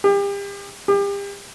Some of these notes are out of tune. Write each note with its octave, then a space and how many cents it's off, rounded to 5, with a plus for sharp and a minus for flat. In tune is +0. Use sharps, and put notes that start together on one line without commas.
G4 +35
G4 +35